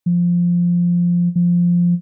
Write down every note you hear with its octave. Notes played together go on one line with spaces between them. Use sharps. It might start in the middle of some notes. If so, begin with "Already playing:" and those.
F3
F3